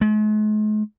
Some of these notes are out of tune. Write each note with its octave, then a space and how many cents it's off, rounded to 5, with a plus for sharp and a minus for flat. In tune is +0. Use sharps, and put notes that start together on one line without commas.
G#3 +45